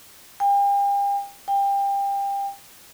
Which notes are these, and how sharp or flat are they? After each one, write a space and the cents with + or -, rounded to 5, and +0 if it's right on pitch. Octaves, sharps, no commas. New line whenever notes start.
G5 +40
G5 +25